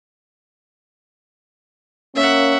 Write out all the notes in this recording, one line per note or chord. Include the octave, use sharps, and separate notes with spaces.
A#3 C#4 E5 F#5